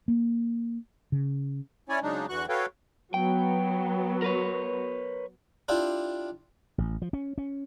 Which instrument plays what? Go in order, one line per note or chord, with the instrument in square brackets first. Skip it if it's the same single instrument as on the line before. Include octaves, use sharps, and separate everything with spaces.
[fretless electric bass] A#3
C#3
[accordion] C#4 E4 C#5 D5 G#5
C#3 F#3 G#3 D4 D#4
E2 D3 E3 F#4 C#6 F#6
F#4 A4 B4 C#5 F5 G5
[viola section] F#3 B3 [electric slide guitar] G5
[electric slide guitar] A#4 B4 C#5
[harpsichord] D4 E4 F4 G4
[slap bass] A1
F3
C#4
C#4